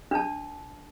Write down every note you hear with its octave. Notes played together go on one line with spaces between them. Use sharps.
D4 A5